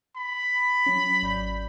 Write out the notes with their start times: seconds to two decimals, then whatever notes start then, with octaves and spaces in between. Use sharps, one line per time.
0.16 B5
0.86 F#3 C#4
1.23 G#1 D5 G6